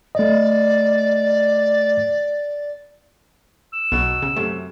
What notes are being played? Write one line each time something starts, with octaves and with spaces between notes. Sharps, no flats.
A3 D5 D#5
E6
B1 B2 F#3
C#3
F#2 C3 A3